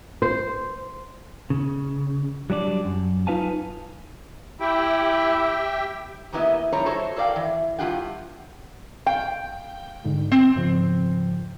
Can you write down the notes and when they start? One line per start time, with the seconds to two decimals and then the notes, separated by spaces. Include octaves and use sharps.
0.22 C5
1.50 C#3
2.50 F#3 G3 D4 D5
2.85 F#2
3.27 D#4 F4 B4 F5 G#5 A5
4.60 E4 G4 E5 G5
6.32 E3 A#3 B3 E4 G4 D#5
6.72 F2 G3 E4 C#5 A#5
6.86 F#4 A4 C5 C#5
7.16 A4 A#4 D5 E5 F5 G5
7.36 E3
7.79 G2 E3 F4 G4 F#5 G5
9.07 F5 G5
10.05 G#2 D3
10.32 B3 C4
10.56 G#2 C#3 F3